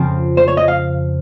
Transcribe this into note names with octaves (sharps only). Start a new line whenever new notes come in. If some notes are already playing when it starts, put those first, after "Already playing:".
Already playing: F2 C#3 F3 C4
C5
C#5
D#5
F5